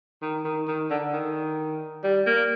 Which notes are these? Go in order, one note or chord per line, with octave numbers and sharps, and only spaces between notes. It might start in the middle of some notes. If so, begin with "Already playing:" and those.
D#3
D#3
D#3
D3
D#3
G3
A#3